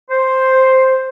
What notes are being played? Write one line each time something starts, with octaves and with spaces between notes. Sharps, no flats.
C5